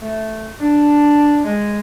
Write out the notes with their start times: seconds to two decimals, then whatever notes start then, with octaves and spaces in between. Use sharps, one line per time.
0.02 A3
0.60 D4
1.44 G#3